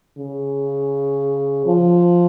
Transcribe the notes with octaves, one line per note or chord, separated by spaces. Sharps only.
C#3
F3